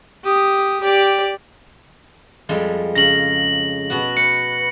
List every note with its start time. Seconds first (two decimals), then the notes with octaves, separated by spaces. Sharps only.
0.24 G4 D#6
0.80 G4 D5
2.49 F2 G3 G#3
2.95 C#3 A#6 F#7
3.90 B2 F#4
4.17 B4 C#7